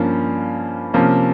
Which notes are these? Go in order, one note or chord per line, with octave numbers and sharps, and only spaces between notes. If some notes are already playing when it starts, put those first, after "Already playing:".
Already playing: G2 F3 A#3 C#4
C3 F3 A#3 C#4